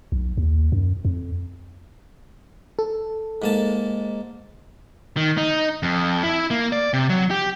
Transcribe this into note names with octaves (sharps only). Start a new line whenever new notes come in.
B1
D#2
F#2
F2
A4
G#2 A#3 A5
D#3
D#4
F2
E4
A#3
D5
C3
F#3
G4